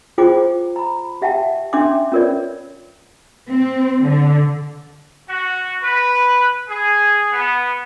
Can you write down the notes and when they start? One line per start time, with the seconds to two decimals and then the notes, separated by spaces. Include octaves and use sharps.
0.18 E4 F4 G#4 C5 G5 D6
0.76 A#5 B5
1.22 G4 E5 F#5 G5 A5
1.73 C#4 D4 E5 C6 D6
2.12 C#4 F4 A#4 B4 C#5 D5
3.49 C4
4.04 D3
5.29 F#4
5.83 B4
6.68 G#4
7.32 B3